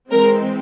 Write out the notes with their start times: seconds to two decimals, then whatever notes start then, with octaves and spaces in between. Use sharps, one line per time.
0.11 E3 G#3 C4 A#4